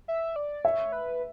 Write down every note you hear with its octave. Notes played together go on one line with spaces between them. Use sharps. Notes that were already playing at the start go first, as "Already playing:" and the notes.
E5
D5
C#5 E5
B4